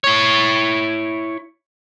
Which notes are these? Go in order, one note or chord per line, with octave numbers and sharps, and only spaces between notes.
E4 C#5